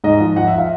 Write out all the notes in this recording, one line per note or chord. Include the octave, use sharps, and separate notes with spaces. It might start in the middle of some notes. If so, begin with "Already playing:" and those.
G#2 D#5
F3
F3 F#5
E5
F5